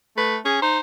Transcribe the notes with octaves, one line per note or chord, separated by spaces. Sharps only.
A3 B4
C#4 G#4
D#4 C5